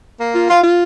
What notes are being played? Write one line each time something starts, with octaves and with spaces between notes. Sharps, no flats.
A#3
F4
F4
F4